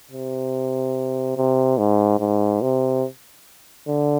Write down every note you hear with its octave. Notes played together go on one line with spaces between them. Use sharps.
C3
C3
G#2
G#2
C3
D3